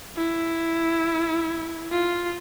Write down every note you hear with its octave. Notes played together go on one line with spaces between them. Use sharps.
E4
F4